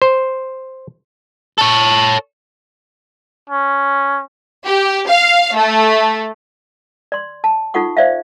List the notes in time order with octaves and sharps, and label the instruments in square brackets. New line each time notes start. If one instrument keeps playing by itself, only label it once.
[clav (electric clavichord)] C5
[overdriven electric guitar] A4 C#5
[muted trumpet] C#4
[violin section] G4
F5
A3
[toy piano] D5 C6
A5
D#4 F4 A4 F#5 C#6
C5 D5 E5 F5